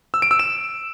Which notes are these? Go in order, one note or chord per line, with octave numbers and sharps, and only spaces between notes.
E6
D7
E6
E7